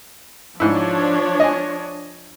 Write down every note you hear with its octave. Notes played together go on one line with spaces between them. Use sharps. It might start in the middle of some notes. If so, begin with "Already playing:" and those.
G#2 F3 D4 E4 C#5
D#5 G#5